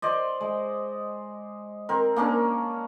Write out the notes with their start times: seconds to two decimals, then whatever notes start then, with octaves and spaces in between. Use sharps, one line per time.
0.02 C5 D5 D#5
0.41 G#3
1.89 C4 A#4
2.16 A#3 C#4 D4 A#4